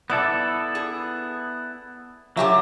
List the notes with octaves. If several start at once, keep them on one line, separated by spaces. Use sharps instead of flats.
B3 E4 A4 D5
G#4
D3 F#3 G4 E5